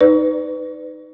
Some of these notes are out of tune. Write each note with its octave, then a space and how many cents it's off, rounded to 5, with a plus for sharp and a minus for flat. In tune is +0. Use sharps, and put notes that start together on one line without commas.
D#4 +0 B4 +25 D5 +0